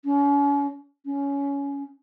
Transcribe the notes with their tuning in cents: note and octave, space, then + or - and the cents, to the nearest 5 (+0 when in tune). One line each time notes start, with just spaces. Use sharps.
C#4 +40
C#4 +15